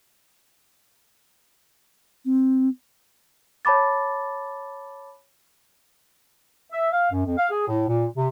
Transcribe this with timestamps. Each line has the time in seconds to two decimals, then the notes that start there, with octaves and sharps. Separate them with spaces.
2.25 C4
3.65 C#5 A5 B5 D6 A6
6.71 E5
6.92 F5
7.11 F#2
7.26 F2
7.37 F5
7.50 G#4
7.68 A2
7.88 A#2
8.16 C3